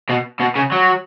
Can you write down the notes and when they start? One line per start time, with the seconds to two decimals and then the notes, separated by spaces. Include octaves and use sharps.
0.09 B2
0.40 B2
0.55 C#3
0.72 F#3